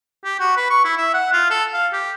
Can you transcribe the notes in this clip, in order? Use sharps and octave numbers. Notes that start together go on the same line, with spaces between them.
G4
F#4
B4
C#6
E4
E5
F#5
F4
A4
F5
G4